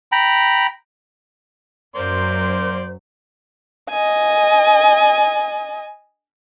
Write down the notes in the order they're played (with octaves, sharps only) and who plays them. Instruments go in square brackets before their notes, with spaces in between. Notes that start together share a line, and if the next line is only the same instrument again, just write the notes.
[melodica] G5 A#5 B5
[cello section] F#2 F#3 [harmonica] A#3 D5 C6 [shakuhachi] C5
[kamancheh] D#5 G#5